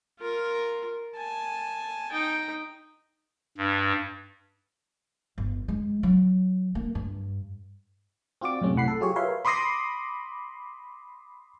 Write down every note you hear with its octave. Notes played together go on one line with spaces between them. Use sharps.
F4 A#4
G#5 A5
D#4 G5
G2
G1
G#3
F#3
A#3
G2
C4 F4 F#4 D5 D6
F#2 A2 C3 G#3 C#4
C2 A2 F#5 B5 C7
A4
F#3 F4 G4 G#4 C#5
A#4 B4 C#5 E5 F5 C6
B5 C6 D6 D#6 A#6 C7